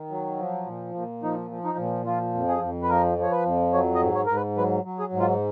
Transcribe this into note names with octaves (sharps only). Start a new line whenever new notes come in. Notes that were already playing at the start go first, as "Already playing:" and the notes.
Already playing: D#3
F#3
F3
A#2
A#2
F3 D#4
F3
D#4
A#2
F3 F4
F2
G#4
F2
B4
F3 A#4
F3 C#5
B4
F2
F#3 C#5
D#5
G#2
C#5
G#2 A#4
B4
F#3 B4
F#3
G#4
G#2
F4